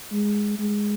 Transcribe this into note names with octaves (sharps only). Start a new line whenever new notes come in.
G#3
G#3